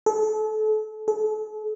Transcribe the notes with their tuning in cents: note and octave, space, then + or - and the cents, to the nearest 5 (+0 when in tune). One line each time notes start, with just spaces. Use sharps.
A4 -35
A4 -40